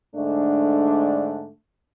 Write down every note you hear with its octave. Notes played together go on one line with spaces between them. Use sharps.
G#2 D3 A3 D4